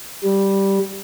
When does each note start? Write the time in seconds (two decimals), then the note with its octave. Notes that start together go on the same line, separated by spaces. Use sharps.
0.24 G3